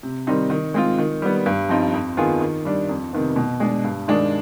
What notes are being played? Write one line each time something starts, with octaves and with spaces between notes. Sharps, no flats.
C3
D#3 G3 C4 D#4
D#3
G#3 C4 F4
D#3
G3 B3
G2
F3 C4 D#4
F2
D#3 B3 F4 G#4
D#3
G3 D4
F2
C3 D#3 B3
B2
G#3 D4
G2
D#3 G#3 D4